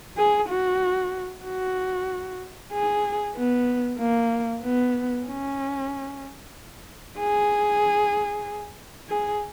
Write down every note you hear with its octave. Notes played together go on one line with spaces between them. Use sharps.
G#4
F#4
F#4
G#4
B3
A#3
B3
C#4
G#4
G#4